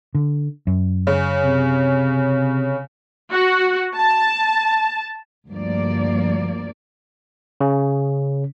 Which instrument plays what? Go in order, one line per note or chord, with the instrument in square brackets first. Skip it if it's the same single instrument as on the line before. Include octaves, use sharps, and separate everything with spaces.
[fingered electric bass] D3
F#2
[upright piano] C#3
[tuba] C3
[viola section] F#4
A5
[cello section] D2 G2 F3 A#3 D5
[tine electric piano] C#3 C#4